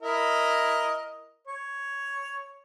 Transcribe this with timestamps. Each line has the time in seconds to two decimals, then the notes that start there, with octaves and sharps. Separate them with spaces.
0.02 E4 A#4 D#5
1.47 C#5